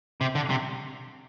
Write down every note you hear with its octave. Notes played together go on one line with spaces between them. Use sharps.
C3
D3
C3